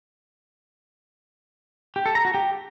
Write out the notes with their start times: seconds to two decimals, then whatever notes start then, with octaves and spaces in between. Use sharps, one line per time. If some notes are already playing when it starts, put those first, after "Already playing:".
1.96 G4
2.06 A4
2.15 A#5
2.25 F#4
2.34 G4